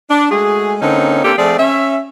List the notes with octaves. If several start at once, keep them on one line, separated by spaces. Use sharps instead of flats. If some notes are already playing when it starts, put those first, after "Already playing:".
D4
G#3 A3 F#4 G#4
D3 A#3 C4 C#4 D#4
A#3 C4 D4 G4 A4
F3 A3 C4 G#4 D5
C#4 E5